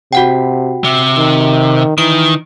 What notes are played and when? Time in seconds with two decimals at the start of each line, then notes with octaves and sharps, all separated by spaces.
0.13 C3 F#4 F#5 G5
0.84 C3
1.18 D#3
1.98 D#3 E3 D7